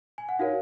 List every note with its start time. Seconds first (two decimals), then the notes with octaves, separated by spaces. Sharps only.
0.18 G#5
0.29 F#5
0.39 D#4 F#4 A#4 C#5 F5